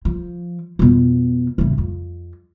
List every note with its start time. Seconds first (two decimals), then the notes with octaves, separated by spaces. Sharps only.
0.05 F3
0.79 F2 B2
1.58 A1 C#3
1.78 F2